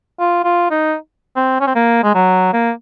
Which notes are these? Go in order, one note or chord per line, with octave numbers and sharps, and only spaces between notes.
F4
F4
D#4
C4
C#4
C4
A#3
G#3
F#3
A#3